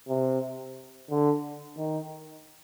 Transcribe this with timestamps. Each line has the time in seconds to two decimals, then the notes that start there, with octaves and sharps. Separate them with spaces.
0.08 C3
1.10 D3
1.78 D#3